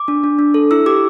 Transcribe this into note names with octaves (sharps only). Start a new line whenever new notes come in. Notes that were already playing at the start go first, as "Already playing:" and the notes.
Already playing: D6
D4
D4
D4
A4
E4 E6
G4 D6